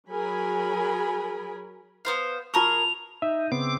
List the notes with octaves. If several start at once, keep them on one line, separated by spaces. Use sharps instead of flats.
F#3 G#4 A#4 G#5 B5
B3 C5 F5
F4 G#4 A#4 A5 C#6 F7
D#4 E5
C#3 B3 C4 D6